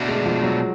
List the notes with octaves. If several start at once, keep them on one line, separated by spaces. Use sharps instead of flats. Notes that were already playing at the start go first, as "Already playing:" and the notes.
Already playing: B2 A3 D4 F#4
G#3
F3
F#3